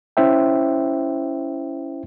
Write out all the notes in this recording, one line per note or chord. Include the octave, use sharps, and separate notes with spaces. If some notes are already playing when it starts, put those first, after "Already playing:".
C#4 E4 C5 E5 G5